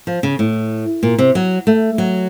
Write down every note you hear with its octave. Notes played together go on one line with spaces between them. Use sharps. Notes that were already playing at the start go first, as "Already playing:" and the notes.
F3
C#3
A2
A#2
C3
F#3
A3
F#3